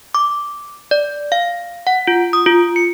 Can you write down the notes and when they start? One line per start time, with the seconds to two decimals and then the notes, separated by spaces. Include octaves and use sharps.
0.15 D6
0.91 D5
1.32 F5
1.87 F#5
2.07 F4
2.33 D#6
2.46 F4
2.76 C#7